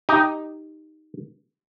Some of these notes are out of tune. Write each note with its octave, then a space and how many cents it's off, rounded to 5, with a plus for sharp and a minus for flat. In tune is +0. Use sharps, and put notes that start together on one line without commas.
D#4 +0 G4 +0